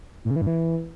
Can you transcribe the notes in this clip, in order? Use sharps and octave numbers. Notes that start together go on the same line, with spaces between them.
A2
C#3
E3
G2
E3